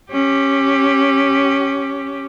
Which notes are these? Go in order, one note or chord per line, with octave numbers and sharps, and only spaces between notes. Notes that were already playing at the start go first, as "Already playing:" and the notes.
C#4 G4